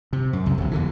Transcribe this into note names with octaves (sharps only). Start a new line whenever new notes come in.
C3
F#2
C2 F#2 C3
D1 C3
E2 D3 E3